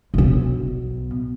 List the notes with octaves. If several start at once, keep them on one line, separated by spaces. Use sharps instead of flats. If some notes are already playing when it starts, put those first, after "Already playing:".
B1 B2